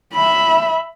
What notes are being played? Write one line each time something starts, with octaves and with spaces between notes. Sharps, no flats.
E5 B5